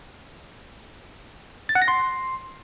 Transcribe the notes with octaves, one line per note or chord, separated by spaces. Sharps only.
A6
F#5
A#6
C6